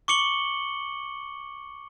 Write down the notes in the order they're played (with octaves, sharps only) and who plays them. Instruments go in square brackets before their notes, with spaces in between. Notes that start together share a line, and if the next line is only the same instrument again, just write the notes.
[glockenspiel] C#6 D6 C#7 F#7 G7